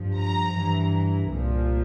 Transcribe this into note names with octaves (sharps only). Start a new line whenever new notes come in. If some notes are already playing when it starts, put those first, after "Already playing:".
Already playing: G2 F3
A#5
G2 E3
C2 A#2 F3